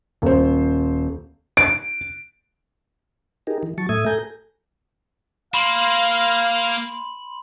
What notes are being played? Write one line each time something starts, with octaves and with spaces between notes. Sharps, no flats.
D#1 C5
D7
D#4 G4 G#4 A#4
E3
F#3 A5 C#6
A2 A3 E5 D#6 G#6
A4 G#5 A#5 G6
A#3 F5 B5 C6 F#7